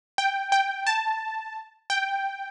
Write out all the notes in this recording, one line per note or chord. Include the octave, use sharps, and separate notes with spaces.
G5
G5
A5
G5